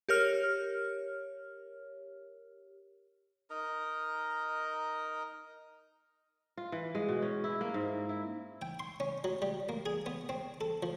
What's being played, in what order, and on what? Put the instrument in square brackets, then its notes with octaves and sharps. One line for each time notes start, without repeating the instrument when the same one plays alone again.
[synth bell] G4 A#4 C#5 F6
[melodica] D#4 A#4 D#5 A#5
[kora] F4
E3
G#3
B2
C#4
E4
A#3
G#2
E4
[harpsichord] G5
C6
C#4
F#3
G3
A#3
G#4
B3
C4
A4
F3